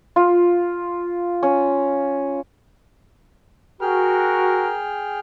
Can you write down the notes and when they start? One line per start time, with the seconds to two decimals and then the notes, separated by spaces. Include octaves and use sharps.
0.16 F4
1.43 C#4
3.81 F#4 G#4 A#4 G5 F6